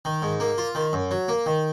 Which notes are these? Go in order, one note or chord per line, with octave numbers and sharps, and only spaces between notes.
D#3
G#2
A#3
F4
D#3
F#2
F#3
A#3
D#3